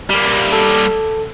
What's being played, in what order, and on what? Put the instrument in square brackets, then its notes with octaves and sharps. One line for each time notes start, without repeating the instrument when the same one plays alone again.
[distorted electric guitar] G3 A#3
[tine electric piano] A4